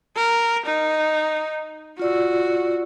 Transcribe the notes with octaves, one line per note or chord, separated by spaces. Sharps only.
A#4
D#4
F4 F#4 D5 E6